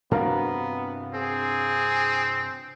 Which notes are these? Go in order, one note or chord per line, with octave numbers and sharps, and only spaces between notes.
G2 C3 B3 D4 F#4 A#4 F5
C4 G#4